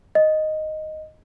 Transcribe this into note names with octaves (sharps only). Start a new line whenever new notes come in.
D#5